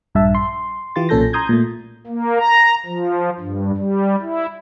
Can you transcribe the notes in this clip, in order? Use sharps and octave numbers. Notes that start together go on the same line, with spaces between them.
A#1 G2 E5 A5
C6
E3 F4 G4 C6 A6
B1 A#2 C#4 A4 G6 A#6
A#5 C6 D#6 G6 G#6
A#2 A3
A#3
A#5
F3
G2
G3
E4